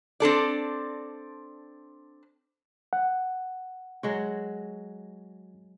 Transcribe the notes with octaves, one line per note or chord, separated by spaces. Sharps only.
C4 D4 A4 D5
F#5
F#3 G#3 F#4